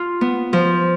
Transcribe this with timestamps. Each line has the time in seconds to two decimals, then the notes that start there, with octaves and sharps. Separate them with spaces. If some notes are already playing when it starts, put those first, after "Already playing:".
Already playing: F4
0.21 B3
0.53 F3